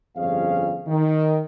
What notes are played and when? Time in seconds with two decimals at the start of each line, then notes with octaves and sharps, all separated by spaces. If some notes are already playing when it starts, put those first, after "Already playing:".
0.17 G1 F2 G3 C#4 G#4 F5
0.88 D#3